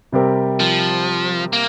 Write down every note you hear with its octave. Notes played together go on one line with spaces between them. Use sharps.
C3 G3 C4 G4 A#4
F3
A#3